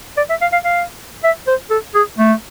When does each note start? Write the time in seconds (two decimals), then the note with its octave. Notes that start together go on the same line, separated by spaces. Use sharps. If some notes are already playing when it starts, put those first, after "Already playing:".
0.17 D5
0.30 E5
0.42 F5
0.53 F5
0.65 F5
1.24 E5
1.47 C5
1.71 A4
1.95 G#4
2.19 A3